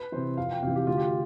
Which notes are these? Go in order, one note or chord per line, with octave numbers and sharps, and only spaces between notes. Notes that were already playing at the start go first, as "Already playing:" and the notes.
Already playing: B4
C3 E3 C5
F2 F5
G5
C3 E3 F5
G4
D2 F4
G4